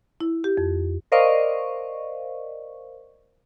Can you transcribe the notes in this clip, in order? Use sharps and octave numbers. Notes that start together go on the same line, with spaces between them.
E4
G4
F2
A#4 C5 D5 D#5 F5 C#6